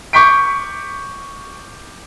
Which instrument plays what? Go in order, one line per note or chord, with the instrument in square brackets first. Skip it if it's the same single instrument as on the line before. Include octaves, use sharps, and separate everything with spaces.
[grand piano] C#6 D6 G6 B6 D7